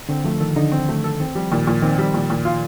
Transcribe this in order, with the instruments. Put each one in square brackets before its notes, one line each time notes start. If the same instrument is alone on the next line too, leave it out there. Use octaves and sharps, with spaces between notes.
[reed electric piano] D3 [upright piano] C4
[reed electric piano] F3 [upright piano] A3
[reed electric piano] D#3 [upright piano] A4
[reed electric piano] D3 [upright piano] D#4
[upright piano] C4
A3
A4
[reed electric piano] D#3 [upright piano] C4
[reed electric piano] F3 [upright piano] G3
[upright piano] A#2 [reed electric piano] D#3
[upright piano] A#2 [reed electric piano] F3
[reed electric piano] D#3 [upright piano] C4
[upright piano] G3
A#2
A#2
F4